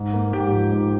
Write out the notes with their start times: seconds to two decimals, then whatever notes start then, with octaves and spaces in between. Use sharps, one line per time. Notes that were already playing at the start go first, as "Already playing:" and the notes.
Already playing: G#2
0.14 A#3
0.33 G#2 G4
0.52 F3
0.72 G#2